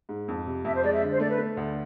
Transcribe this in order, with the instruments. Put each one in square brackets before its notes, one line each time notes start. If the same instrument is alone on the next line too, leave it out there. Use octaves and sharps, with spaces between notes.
[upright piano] G#2
F2
C3
[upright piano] F2 [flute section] E5
[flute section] C5
[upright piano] G#3 [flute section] D5
[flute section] E5
[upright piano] D3
[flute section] C5
[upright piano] A3 [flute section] D5
[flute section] B4
[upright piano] A3
D2